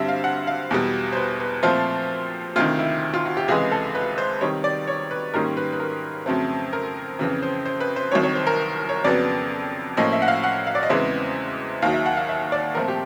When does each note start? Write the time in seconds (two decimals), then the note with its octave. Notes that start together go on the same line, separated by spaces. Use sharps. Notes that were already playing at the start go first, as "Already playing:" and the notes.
Already playing: G2 D3 G3 C4 E5
0.08 F5
0.24 F#5
0.47 F5
0.71 E2 B2 G3
1.12 C5
1.16 B4
1.40 B4
1.63 A#2 F3 A3 C4 F4
2.56 D2 C3 D#3 F4
2.79 E4
3.14 F4
3.25 F#4
3.37 G4
3.48 C#2 C3 E3 G#3 G#4
3.71 A4
3.95 B4
4.18 C5
4.41 C3 D#3 G3 C#5
4.64 D5
4.87 C#5
5.11 B4
5.34 G#2 D#3 G3 A#3 C#4 A#4
5.57 B4
5.73 B4
5.80 A#4
6.26 F2 C#3 F#3 A3 C4
6.73 A#4
7.19 F2 C#3 E3
7.42 C5
7.65 C5
7.80 B4
7.96 C5
8.12 C2 C3 D#3 F#3 C#5
8.23 C#5
8.35 C5
8.47 A#4
8.89 C#5
9.04 F2 C#3 F#3 B3 D5
9.97 A2 F3 A#3 C#4 D#5
10.13 E5
10.22 F#5
10.28 F5
10.44 F#5
10.67 F5
10.75 D5
10.83 D#5
10.90 E2 C#3 E3 G#3 C4 E5
11.82 D#2 D#3 F#3 F5
11.94 E5
12.06 F#5
12.17 F5
12.29 E5
12.52 D5
12.75 A#2 F3 A3 C4 A#4
12.88 G4